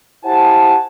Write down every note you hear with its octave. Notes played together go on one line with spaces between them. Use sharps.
E4 G4 C5 F#5 G#5 A5